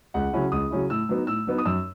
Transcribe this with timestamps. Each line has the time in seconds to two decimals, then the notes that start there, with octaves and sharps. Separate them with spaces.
0.14 C#2 F#5
0.33 C#3 F#3 C#4 E4
0.52 C#2 D#6
0.71 C#3 F#3 C#4 E4
0.90 A2 E6
1.09 F#3 B3 D#4
1.27 A2 E6
1.47 F#3 B3 D#4
1.58 D#6
1.65 F#2 E6